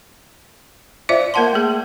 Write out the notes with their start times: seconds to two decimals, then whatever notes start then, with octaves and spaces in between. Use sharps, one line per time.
1.09 F4 C5 D5 E5 F5
1.34 A#3 A#4 E5 F#5 A5 C6
1.53 A3 G#4